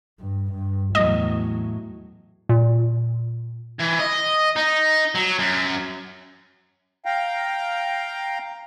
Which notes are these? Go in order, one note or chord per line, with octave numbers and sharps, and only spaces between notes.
G2
G2
E2 A2 F#3 D#5
A#2
E3
D#5
D#4
F#3
F#2
F5 G5 A#5